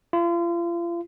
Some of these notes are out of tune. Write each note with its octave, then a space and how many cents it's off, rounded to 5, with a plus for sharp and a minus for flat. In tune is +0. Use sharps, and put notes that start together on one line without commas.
F4 -35